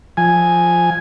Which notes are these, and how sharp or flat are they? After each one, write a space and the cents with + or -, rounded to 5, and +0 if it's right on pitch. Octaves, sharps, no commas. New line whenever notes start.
F3 +0 G#5 +0